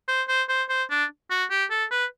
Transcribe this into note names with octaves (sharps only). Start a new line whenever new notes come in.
C5
C5
C5
C5
D4
F#4
G4
A4
B4